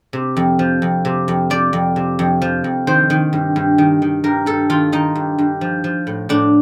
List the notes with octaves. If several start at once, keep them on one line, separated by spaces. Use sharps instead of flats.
C3
F2
F3
F2
C3
F2
F3 D5
F2
C3
F2
F3
F2
D#3 C5
D#3
G2
G2
D#3
D#3
G2 A#4
G2 A4
D#3 F4
D#3 D#4
G2
G2
F3
F3
A2
A2 D4